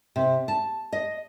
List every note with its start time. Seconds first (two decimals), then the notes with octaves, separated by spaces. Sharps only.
0.16 C3
0.48 A5
0.93 D#5